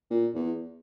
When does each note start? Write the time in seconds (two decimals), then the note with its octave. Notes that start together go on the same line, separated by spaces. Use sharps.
0.10 A#2
0.35 E2